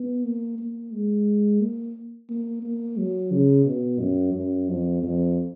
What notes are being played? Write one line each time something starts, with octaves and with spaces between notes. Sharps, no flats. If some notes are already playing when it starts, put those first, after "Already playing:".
Already playing: B3
A#3
A#3
G#3
A#3
A#3
A#3
F#3
C#3
B2
F#2
F#2
F2
F2